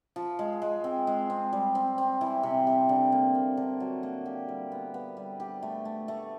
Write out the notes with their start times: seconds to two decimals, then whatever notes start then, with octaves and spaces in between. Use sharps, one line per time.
0.16 F3
0.39 G#3
0.62 G#3
0.84 C4
1.07 G#3
1.30 C4
1.53 G3
1.75 C4
1.98 C4
2.21 E3
2.43 C3
2.67 C3
2.89 D3
3.12 A#3
3.35 A#3
3.57 D3
3.80 F#3
4.03 A#3
4.26 G4
4.49 G3
4.72 B3
4.94 B3
5.17 G3
5.40 G4
5.63 A3
5.85 A3
6.08 A3